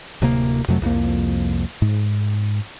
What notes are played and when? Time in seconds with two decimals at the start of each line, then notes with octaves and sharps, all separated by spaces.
0.22 D1 C3 A#3
0.68 F2 C3 F#3 A3
0.82 C2 F2 F3 A#3
1.82 G#2